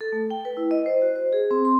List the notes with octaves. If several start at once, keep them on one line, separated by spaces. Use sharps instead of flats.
A4
A3
G5
B4
E4
D#5
C5
F#4
C5
G#4
C4
C6